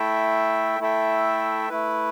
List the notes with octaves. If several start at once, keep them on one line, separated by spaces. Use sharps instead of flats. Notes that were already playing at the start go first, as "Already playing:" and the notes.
Already playing: A3 E4 A4 E5 G5
A3 E4 A4 E5 G5
A3 E4 B4